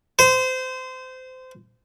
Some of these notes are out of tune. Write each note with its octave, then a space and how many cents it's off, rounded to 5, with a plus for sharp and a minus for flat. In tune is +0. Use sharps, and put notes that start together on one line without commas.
C5 -25